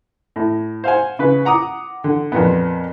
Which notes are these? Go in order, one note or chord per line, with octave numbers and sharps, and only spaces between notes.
A2
C5 F5 F#5 G#5
C#3 B4
F#5 A#5 D6 D#6
D3
F2 A#2 B3